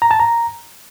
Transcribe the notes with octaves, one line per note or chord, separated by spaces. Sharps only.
A#5
A5
A#5